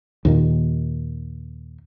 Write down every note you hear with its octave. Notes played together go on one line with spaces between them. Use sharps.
D#2 A#2 D#3